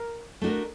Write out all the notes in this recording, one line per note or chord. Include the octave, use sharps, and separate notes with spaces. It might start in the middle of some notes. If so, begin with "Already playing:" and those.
Already playing: A#4
A3 D4 F#4 A#4